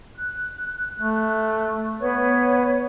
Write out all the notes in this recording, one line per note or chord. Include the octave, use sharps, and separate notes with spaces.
F#6
A3
B3 B4 C#5